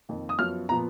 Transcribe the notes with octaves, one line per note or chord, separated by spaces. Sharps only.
F2 D#3 A#3
D#6
F#2 F3 B3 F6
A#2 F3 B3 A#5